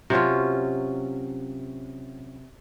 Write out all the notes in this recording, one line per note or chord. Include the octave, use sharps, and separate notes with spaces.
C3 F#3 C#4 F4